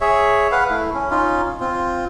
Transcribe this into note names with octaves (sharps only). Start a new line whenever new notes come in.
G#4 C#5 E5
B4 F5 F#5
A3 E4
C#4
C#4 D#4 F4
C4 F4